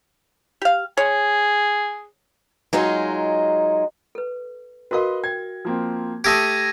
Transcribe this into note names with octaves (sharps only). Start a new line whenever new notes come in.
G4 F5
G#4 C#5
F#3 G#3 D#4 F4
A4 B4
F#4 A#4 B4 D#5 F5 C6
G5 G#6
F3 A#3 C4
A3 G4 D#6 E6 G#6 A#6 D7 D#7